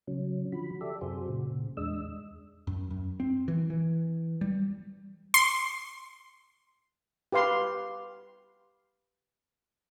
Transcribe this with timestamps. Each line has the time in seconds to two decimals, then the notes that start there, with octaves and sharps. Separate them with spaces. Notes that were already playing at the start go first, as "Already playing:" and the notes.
0.08 C#3 F#3 C#4
0.52 D3 F3 F#4 B5
0.81 G4 A4 D5 E5
1.01 F#2 C3 F#4 G#4 C5
1.29 A#2 C#3
1.77 E2 G#3 D4 D#5 E6
2.67 F#2
2.90 F#2
3.20 C4
3.48 E3
3.70 E3
4.41 G3
5.34 C6
7.32 G4 B4 F5 C6